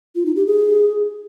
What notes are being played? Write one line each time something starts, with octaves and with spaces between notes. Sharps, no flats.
F4
D#4
G4
G#4